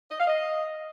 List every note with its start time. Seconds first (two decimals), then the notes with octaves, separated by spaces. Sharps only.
0.10 D#5
0.19 F5
0.27 D#5